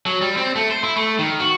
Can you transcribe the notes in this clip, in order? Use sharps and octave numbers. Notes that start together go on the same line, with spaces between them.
F#3
G3
C4
A3
C5
E4
A3
D#3
F#4